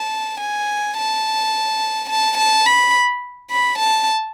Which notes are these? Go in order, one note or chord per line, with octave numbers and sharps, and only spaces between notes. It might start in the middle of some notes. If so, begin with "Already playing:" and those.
Already playing: A5
G#5
A5
A5
A5
B5
B5
A5